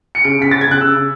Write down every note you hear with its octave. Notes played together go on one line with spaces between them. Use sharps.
C#7
C#3 D7
C#3 B6
C#3 A6
G#6
C#3 F#6
C#3 E6
C#3